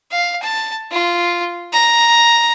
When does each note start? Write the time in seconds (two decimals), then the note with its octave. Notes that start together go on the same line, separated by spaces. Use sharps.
0.11 F5
0.42 A5
0.92 F4
1.73 A#5